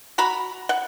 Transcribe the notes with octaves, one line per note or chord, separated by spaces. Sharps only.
F#4 A#5 B5
F#5